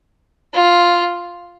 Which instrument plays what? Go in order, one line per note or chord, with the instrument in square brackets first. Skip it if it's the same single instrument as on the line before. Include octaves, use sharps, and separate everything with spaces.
[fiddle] F4